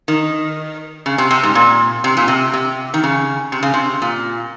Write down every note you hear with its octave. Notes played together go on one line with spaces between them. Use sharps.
D#3
C#3
C3
C3
G#2
A#2
C3
A#2
C3
C3
D#3
C#3
C3
C#3
C3
A#2